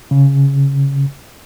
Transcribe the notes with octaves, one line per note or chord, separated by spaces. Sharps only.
C#3